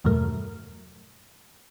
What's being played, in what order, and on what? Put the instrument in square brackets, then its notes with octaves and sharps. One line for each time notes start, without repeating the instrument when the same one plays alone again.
[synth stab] E2 G2 B2 F#3 A3 A#4